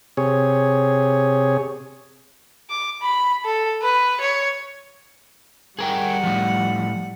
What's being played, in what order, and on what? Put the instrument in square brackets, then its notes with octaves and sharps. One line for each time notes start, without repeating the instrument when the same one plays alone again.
[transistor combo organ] C3 G#4 C#5
[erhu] D6
B5
A4
B4
C#5
[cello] G3 F#5 [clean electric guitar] G#4 A#4 G5
[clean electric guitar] A2 F3